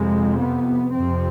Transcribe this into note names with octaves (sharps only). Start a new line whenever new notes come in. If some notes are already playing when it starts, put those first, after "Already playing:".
Already playing: F2 C3 G#3
B3
F2 C3 C4